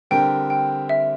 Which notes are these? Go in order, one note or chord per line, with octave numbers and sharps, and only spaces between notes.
D3 G3 C4 G4 A#4 G5
G5
E5